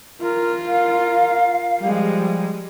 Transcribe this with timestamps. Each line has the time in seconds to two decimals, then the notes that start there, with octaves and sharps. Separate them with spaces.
0.22 F4 A#4
0.68 A#4 F5
1.80 F3 G3 G#3